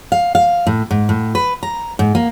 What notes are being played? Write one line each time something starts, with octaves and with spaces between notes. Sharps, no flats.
F5
F5
A2
G#2
A2
B4
A#5
G#2
A#3